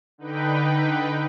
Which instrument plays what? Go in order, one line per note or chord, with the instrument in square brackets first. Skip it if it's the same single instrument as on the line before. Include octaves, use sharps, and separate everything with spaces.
[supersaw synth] D3 D#4 B4 G5